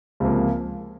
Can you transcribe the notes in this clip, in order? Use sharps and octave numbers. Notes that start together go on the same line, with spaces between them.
C#2 C3 F3 A#3